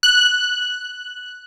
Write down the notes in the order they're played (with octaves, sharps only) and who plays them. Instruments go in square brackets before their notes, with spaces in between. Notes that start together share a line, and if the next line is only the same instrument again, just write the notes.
[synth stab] F#6